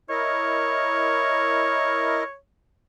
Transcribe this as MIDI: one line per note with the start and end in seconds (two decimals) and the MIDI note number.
0.10 2.24 64
0.10 2.24 70
0.10 2.36 73
0.10 2.24 75